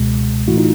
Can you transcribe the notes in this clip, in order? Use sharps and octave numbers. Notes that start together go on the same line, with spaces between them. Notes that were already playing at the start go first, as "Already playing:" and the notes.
Already playing: C#2 B2 G#3
A2 E3 A3 E4 F#4
D#4 F4